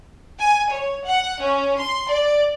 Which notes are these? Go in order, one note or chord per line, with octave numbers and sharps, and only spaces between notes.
G#5
C#5
F#5
C#4
C6
D5